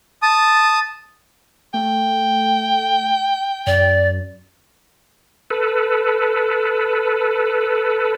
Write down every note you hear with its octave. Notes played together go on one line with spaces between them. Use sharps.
A5 D#6
A3 G5
F#2 D5
A4 B4